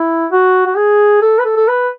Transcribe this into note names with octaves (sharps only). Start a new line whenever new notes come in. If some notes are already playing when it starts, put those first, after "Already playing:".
Already playing: E4
F#4
F#4
G#4
A4
B4
A4
A4
B4